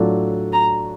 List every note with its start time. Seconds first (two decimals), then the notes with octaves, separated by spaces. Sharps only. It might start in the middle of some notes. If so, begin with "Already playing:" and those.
Already playing: A2 F#3 A3 D4 F4
0.53 A#5